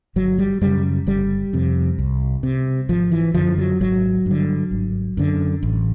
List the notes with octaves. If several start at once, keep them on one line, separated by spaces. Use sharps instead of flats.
G1 F#3
G3
F#2 C#3 G3
G1 G3
F2 C3
C2
C3
G#1 F3
E3
F#2 D3 F3
F#3
G#1 F#3
G2 D3
G#1
F#2 D3
A1